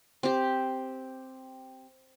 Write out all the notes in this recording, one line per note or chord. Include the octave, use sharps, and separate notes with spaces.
C4 G4